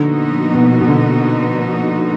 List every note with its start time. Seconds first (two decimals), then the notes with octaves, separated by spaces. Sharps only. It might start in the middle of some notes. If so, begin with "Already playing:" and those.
Already playing: A#2 D3 F3 B3 D#4 F#4
0.54 B2
0.81 B2
0.88 D3